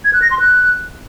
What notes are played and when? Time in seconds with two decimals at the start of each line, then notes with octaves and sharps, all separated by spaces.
0.05 G#6
0.13 F#6
0.22 A#6
0.31 C6
0.39 F#6